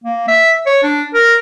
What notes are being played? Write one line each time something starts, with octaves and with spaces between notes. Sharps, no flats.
A#3
E5
C#5
D4
A#4